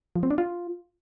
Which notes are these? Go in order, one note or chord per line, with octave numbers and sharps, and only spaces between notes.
F3
C4
D4
F4